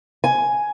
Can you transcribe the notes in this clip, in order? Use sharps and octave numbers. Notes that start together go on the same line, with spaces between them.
G#5